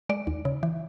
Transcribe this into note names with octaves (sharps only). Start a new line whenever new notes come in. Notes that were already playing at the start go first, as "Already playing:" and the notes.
G#3 D5
D#2
C#3
E3